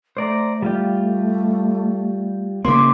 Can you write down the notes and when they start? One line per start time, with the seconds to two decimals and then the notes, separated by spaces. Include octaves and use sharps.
0.17 A3 C5 D5 A#5
0.62 G3 A3 F4 G4
2.65 C#3 A#3 C6 D6